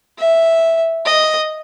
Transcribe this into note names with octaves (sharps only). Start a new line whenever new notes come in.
E5
D#5